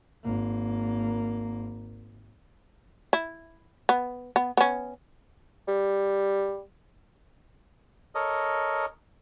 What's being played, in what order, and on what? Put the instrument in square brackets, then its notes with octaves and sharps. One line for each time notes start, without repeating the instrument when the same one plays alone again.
[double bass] G#1 A#3
[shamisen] E4
B3
B3
B3 C#4
[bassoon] G3
[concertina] A4 A#4 C#5 D#5